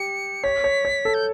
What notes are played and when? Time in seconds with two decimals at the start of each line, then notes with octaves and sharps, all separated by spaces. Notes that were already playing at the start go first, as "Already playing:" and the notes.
Already playing: G4 C#7
0.44 C#5 B6
0.64 C#5
0.85 C#5
1.05 A4
1.14 G6